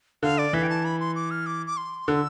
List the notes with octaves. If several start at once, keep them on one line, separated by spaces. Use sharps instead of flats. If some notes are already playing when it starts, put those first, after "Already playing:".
D3 F5
D5
E3 E5
G5
A5
B5
C6
D6
F6
D6
D6
C6
D3 E6